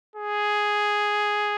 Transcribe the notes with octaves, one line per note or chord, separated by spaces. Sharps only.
G#4